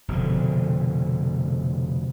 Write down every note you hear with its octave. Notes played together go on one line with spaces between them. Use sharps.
F1 B2 D3 F3